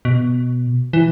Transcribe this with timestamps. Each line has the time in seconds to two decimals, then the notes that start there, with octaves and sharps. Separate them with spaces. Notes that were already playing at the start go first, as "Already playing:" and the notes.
0.05 B2
0.93 E3